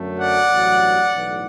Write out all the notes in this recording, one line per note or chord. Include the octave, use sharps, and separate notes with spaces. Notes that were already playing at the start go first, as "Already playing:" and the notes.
Already playing: F#2 D3 F#3 A3
D5 F#5
A1 G2 F#3 B3
B1 A2 E3